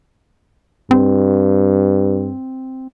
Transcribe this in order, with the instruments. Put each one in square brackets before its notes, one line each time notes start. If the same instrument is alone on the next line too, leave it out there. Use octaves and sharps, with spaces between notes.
[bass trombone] G2 [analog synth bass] C4